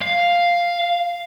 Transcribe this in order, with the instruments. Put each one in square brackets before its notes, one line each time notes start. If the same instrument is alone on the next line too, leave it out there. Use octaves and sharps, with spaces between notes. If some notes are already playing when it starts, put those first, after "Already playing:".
[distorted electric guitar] F5